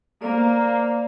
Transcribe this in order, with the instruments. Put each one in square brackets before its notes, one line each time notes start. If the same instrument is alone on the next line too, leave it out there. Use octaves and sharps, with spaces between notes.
[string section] A#3 [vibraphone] C5 D5